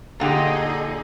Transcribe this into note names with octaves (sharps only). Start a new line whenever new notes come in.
A#2 D3 D#4 G4 G#4